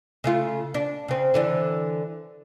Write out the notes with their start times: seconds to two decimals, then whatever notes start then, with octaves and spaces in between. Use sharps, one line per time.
0.24 C#3 A3 F4
0.74 D4
1.08 C#3 C4
1.34 D3 E3 D4